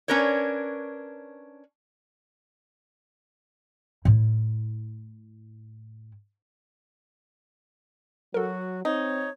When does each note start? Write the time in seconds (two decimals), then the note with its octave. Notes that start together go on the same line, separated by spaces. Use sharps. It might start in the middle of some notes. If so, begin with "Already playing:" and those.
0.08 C#4 D4 A#4 B4 C#5
4.05 A2 E4
8.34 F#3 F#4 A4 A#4
8.85 C4 D#4 C#5